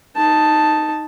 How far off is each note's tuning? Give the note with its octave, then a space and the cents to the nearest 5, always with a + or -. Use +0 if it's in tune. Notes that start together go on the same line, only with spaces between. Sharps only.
D#4 +0 A5 +0